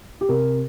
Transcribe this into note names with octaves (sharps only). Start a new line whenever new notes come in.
G4
C3 A#4